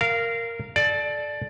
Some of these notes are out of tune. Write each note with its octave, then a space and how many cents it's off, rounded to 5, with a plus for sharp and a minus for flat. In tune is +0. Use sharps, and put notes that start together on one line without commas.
A#4 -5 F5 -20
A4 -30 D5 +10